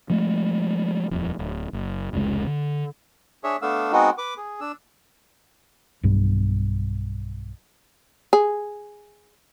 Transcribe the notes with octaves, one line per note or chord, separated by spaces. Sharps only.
F3 G#3 A3
D#1 F2
D1
F#1
F1 C#2 G#3
D3
D4 G#4 C#5 E5
A3 B3 D4 F5 E6
G#3 B3 C4 D#4 F#4
B4 D6
G#4
D4 E6
B1 G2 G3
G#4